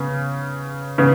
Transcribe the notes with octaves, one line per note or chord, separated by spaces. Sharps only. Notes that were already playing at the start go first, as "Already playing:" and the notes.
Already playing: C#3 B3
C#3 B3